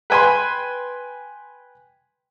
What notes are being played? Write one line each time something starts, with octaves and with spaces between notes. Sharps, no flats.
B4 G5 G#5 B5 C6